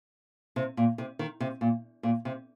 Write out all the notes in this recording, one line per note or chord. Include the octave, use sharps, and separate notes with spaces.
C3
A#2
C3
D#3
C3
A#2
A#2
C3